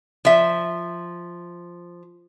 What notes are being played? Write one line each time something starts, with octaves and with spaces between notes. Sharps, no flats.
F3 E5